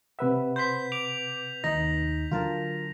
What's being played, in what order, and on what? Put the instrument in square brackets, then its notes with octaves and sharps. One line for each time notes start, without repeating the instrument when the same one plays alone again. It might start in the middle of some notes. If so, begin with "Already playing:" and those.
[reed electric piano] C3 B4 F#5 [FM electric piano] E5
[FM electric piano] C5 B5 C6 [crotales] G6 B6
[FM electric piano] D6 [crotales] F7
[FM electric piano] D#2 D#4 [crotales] A#6
[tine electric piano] D3 F#3 [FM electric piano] F4 A#4 A5